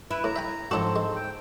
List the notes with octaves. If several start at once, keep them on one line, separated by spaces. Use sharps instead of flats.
E4 B4
A2 A#5
E5 G5 G#5
G#2 F3 C4 D4 F#4 A4
G#3
G5